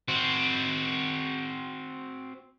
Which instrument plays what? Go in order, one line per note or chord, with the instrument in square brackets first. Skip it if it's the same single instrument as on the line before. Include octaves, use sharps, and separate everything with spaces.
[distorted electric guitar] C4 F#4